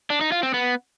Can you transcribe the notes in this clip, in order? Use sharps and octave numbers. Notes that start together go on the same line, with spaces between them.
D4
D#4
F4
C4
B3